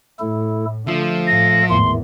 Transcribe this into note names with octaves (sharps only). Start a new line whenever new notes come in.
A2 A3 E4 A4
D3 F3 A3 A4 F5
A2 A#6
G#1 E2 A2 D#3 A3 C6